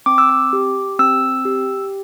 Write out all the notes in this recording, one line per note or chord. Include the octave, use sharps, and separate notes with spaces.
C4 D6
E6
D6
G4
C4 E6
G4